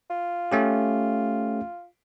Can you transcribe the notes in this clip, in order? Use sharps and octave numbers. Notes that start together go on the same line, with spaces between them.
F4
A3 C#4 G4